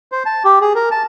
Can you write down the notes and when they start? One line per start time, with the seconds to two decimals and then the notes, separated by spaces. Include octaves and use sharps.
0.12 C5
0.25 A5
0.45 G4
0.61 G#4
0.75 A#4
0.91 A5